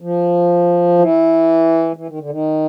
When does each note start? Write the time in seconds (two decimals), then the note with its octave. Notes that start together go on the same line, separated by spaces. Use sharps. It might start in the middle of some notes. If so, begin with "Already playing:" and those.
0.01 F3
0.99 E3
1.96 E3
2.08 D#3
2.19 D3
2.30 D#3